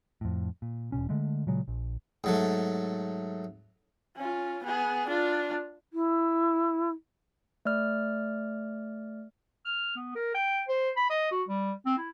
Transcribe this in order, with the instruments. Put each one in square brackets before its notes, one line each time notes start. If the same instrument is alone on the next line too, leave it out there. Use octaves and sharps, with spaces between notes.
[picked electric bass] F2 A2
A#2
E1 C#2 B2 C#4
D3 G#3 A3
A#2 C#3 F#3 G#3
A#1
[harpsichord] G#2 F#3 A3
[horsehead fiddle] C#4 F4
B3 G#4
D4 F4
[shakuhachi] E4
[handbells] A3 D5 F6
[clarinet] F6
B3
A#4
G5
C5
B5
D#5
F#4
G3
C4
E4